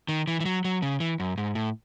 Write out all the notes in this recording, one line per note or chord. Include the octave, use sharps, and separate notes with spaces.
D#3
E3
E3
F#3
F#3
C#3
E3
F#2
G#2
A2